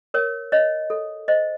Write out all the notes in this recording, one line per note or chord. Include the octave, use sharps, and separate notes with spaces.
A#4 C#5
C#5 D#5
A4
C5 D#5